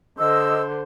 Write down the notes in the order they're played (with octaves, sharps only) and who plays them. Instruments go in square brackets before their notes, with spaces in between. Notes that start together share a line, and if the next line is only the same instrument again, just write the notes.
[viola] D3 C5 [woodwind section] D#5 E6